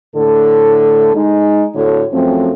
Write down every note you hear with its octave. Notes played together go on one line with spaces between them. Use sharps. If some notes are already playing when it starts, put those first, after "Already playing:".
A2 D3 A3 A4
G#3 D#4
A2 D3 F#4 A4 C#5
F#2 F3 A3 C4